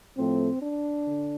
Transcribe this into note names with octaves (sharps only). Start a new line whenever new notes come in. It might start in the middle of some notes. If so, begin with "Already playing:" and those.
A2 F3 A3 C4
D4
D3